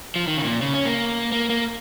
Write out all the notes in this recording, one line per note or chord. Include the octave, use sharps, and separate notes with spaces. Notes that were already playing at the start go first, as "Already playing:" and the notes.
F3
D#3
C#3
A#2
C#3
C#4
A#3
A#3
A#3